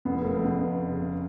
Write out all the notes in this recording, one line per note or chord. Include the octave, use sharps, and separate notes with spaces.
F1 B3
C#3 A3
F2
C#3 B3
F1
F1
C#3